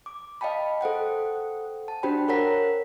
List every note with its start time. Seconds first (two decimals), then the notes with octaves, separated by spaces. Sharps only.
0.06 D6
0.41 D#5 F5 G5 A5 B5
0.81 A4 C5 F#5 G5
1.88 A5
2.03 D4 F#4 G4 C5 G5 B5
2.28 A#4 C#5 F#5 A#5 B6